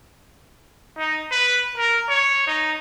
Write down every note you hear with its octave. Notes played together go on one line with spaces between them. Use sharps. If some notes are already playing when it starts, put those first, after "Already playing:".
D#4
B4
A#4
C#5
D#4